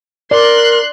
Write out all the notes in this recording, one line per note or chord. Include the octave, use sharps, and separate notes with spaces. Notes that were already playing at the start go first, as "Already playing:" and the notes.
A#4 D5 C6 F#6